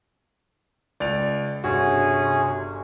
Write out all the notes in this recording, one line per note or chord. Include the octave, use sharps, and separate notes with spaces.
C#2 D5 F7
G1 C3 C#4 F#4 G#4